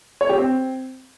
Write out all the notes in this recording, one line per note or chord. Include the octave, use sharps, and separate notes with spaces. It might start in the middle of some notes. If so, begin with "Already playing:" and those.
C#5
G4
C4